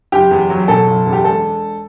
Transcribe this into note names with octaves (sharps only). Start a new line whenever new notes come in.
F#1 G4
E2
F#3
B2 A4
F#1
E2
G4
E1 A4